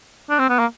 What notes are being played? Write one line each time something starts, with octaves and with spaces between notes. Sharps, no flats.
D4
C4
B3
A#3